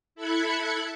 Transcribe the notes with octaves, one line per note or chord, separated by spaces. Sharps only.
E4 A4 B5 F#6 G#6 C#7